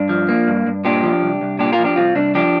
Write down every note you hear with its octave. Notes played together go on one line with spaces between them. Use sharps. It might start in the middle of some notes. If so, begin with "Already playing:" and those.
Already playing: G2 D4
F3
A#3
G2
G2
A#2 D4 G4
F3
C2
C2
A#2 D4 G4
F4 A#4
F3
D4 G4
C2 C4 F4
C2 D4
F3 D4 G4